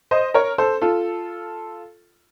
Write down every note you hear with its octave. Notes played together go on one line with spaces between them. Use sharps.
C5 D#5
A#4 C#5
A4 C5
F4 A4